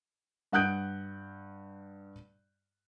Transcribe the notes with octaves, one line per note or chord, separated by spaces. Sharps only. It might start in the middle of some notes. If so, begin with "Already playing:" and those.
G2 F#5 D#6 F#6 G6 D7